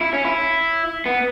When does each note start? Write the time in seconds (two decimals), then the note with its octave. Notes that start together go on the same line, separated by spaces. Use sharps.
0.01 E4
0.13 C#4
0.25 E4
1.06 B3